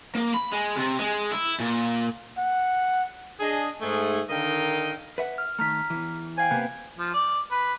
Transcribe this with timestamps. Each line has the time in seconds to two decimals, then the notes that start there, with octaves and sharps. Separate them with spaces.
0.15 A#3
0.34 B5
0.52 G#3
0.76 C3
0.99 G#3
1.31 E4
1.60 A#2
2.38 F#5
3.40 D4 G#4 D#5
3.81 G#2 A3 G#4
4.30 D3 D#3 A#4 D#5 F5 G5
5.18 B4 E5 F#5
5.38 F6
5.59 D#3 A3 A#5 F6 B6
5.90 E2 E3
6.38 C5 F5 G5 G#5
6.51 C3 A#3 B3 B4
6.98 F3
7.14 D5
7.52 B4